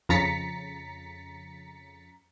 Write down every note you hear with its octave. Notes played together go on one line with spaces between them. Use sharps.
F2 C#3 A#5 A6 B6 C#7